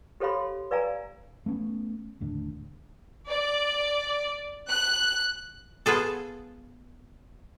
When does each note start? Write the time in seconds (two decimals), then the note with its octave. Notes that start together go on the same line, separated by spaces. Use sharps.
0.20 G4 A4 C#5 F5 B5 C6
0.71 B4 D5 F5 G#5 A#5
1.46 A3 B3 C#4
2.20 D#2 A2 D3
3.28 D5
4.69 F#6
5.86 B3 F4 G#4 A4